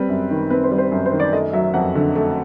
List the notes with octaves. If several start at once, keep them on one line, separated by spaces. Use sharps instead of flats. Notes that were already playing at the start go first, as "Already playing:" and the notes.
Already playing: G3 C4 B4
F#2
D#3
C4 B4
C5
G3
C5
F#2
C5
D#3
D5
A3 D#5
F#3 E5
F2 F#5
D3
A3